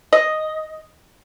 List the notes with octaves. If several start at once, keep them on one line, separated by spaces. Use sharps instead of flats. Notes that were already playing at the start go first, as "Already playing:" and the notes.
D#5